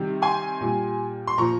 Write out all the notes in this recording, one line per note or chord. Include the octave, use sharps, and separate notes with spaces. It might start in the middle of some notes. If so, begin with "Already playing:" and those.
Already playing: C3 D#3 G3
G#5 C6
A#2 G3
C6
A#2 F3 A#5 C#6